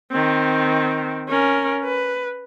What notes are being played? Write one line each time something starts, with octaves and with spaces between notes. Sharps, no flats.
D#3 C4
C#4 A#4
B4